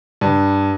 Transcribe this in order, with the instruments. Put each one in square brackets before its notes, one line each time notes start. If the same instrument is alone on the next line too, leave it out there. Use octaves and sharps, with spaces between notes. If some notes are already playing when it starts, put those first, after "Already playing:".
[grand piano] G2